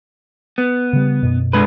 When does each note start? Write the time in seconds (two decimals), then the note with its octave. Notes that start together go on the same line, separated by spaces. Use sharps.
0.58 B3
0.93 C#3 G3
1.23 F#2 B2
1.53 D3 G#3 B4